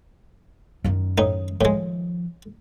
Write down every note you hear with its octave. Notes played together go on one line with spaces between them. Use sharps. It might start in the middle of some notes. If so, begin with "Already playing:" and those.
F#2 D#3
A2 D#4
A2 D#3 F3 G#3